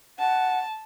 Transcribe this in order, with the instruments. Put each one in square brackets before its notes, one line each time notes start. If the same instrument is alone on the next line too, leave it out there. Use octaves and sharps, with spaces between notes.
[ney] F#5 [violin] A5